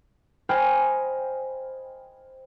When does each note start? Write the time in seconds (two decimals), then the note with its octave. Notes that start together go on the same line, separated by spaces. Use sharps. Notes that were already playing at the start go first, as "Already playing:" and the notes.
0.49 C5 D#5 G5 G#5 B5 F6